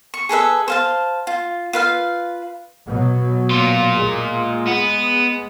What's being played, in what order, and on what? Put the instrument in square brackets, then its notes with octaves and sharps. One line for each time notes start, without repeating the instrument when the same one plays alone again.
[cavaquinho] C#6
G#4 A4 B4 E5
C5 F5 A5
F4
F4 B4 F5
[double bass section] B2 F#3
[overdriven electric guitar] A#2 F4
[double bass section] G#3
[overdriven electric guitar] B3